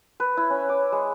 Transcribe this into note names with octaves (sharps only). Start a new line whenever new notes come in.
B4
E4
C#4
D6
G#3